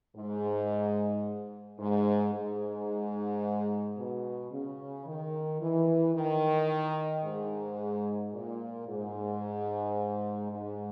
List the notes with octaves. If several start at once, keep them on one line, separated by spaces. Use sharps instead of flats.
G#2
G#2
G#2
B2
C#3
D#3
E3
D#3
G#2
A#2
G#2
G#2